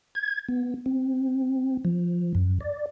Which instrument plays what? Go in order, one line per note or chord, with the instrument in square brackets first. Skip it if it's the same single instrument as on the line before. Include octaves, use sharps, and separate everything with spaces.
[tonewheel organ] G#6
B3
C4
F3
F#2
D5